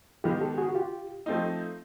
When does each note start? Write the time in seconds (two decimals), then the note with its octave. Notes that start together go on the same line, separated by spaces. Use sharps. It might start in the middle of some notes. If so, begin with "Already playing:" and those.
0.24 D#3 G#3 B3 F4 G4
0.41 G4 A4
0.58 F#4 G#4
0.69 F#4
0.75 F4 G4
1.26 F3 A3 C4 D#4